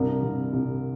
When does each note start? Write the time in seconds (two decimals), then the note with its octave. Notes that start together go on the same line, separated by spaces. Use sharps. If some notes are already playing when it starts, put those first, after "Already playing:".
Already playing: C2 G2 A#4
0.23 C2
0.53 C2